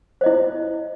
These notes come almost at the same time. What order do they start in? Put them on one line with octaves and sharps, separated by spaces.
C5 D#5 E4